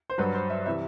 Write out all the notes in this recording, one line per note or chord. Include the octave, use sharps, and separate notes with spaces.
C5
G2 F#3 B4
C5
E5
C3 E3 E5